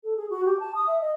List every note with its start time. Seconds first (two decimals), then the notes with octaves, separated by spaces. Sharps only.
0.04 A4
0.17 G#4
0.30 F#4
0.46 G4
0.60 A5
0.75 D#6
0.87 E5
1.01 D#5